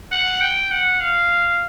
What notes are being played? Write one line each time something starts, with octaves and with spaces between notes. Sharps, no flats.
F#5
G5
F#5
F5